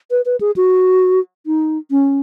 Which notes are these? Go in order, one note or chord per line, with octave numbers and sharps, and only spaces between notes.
B4
B4
G#4
F#4
D#4
C#4